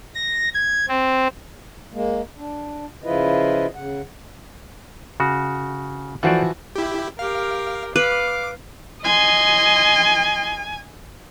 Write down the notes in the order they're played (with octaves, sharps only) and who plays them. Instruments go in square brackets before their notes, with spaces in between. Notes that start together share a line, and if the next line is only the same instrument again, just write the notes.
[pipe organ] A#6
G#6
C4
[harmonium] G#3 A#3
D4
C#3 F3 E4 F4 B4 D#5
C#3 F#5
[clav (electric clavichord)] C#3 F#4
[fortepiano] E3 F3 F#4 [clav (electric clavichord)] A4 C5 D5
[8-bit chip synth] E4 G4
[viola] G4 A#4 [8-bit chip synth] F5
[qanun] B4 [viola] F5 [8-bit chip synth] D6
[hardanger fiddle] D#5 C6 [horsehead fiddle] G#5